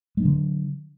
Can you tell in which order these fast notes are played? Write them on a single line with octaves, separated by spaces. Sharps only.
G#3 D4 F#3 D3